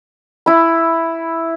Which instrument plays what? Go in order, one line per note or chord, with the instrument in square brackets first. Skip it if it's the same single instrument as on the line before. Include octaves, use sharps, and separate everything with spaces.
[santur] E4 B5